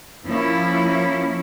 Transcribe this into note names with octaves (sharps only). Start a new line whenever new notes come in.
F3 A#3 C#4 E4